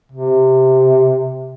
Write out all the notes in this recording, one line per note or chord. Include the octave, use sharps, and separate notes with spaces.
C3